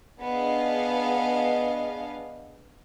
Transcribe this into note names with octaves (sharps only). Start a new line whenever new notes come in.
B3 D4 G#4 D#5 F5